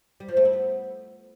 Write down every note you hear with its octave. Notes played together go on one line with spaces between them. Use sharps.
G3
F3
A3
E4
B3